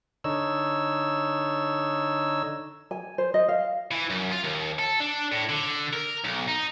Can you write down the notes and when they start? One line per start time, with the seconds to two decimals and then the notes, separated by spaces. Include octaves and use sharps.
0.24 D3 D#4 C#5 E6
2.91 G#5
3.18 C5
3.34 D#5
3.48 F5
3.91 E3
4.10 F#2
4.31 F4
4.44 D#2
4.79 A4
5.00 D4
5.32 A2
5.49 D3
5.93 A#4
6.24 B1
6.48 D#4